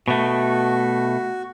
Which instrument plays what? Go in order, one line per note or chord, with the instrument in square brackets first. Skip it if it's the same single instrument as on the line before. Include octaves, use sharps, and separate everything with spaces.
[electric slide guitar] B2 A3 [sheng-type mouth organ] F#4